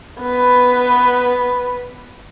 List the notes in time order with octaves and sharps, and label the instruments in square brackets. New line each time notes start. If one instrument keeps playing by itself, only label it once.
[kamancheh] B3 B4